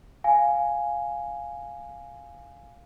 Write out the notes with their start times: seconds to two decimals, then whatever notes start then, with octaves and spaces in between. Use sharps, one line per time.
0.24 F5 G#5